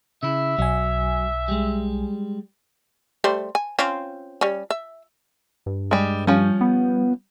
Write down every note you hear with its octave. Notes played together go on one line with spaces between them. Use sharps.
C#3 E4 E5
B1 F#3 G#5
G3 G#3
G3 A3 C5
G#5
C4 C#4 F4
G3 C#4
E5
G2
G3 G#3
F3 G3 C#4
B3